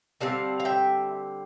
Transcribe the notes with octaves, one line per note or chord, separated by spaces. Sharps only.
D3 G3 C4 F5 A5
F5
E5 G5